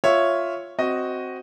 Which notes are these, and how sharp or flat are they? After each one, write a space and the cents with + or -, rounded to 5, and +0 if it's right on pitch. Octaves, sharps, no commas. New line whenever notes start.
F4 +0 C#5 +0 E5 +0
C4 +0 F#4 +5 D#5 +0